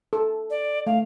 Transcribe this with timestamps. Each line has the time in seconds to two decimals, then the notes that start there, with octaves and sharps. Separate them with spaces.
0.13 A4
0.50 D5
0.86 A3 F5